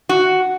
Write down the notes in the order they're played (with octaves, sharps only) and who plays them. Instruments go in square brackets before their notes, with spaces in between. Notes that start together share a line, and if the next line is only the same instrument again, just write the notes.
[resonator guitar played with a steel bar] F#4